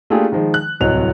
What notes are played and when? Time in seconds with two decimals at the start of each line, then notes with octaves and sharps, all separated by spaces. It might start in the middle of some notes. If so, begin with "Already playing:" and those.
0.10 A3 A#3 D4 F4 G4 G#4
0.32 D#3 F3 G#3
0.54 F#6
0.80 D1 C2 F#3 D#5 F7